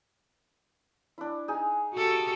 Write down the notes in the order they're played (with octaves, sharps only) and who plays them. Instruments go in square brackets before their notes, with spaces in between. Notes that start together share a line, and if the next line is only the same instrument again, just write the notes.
[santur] D4 E4
D#4 G#4 G#5
[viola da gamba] F#4 G4 A4